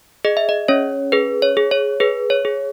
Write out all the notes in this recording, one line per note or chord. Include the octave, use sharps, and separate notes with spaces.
G#4 D#5
E5
D#5
C#4 C#5
G#4 B4
C#5
G#4
C#5
G#4 B4
C#5
G#4